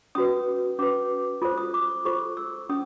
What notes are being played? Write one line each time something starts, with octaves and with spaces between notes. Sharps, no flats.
C#4 F#4 B4 D#6
C#4 F#4 B4 D6
F4 A4 C5 D#6
D#6
D6
F4 A4 C5 C#6
E6
C#4 D#6